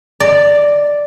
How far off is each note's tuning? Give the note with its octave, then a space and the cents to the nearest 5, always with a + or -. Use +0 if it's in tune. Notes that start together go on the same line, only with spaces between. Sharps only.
D5 +0 A#5 -35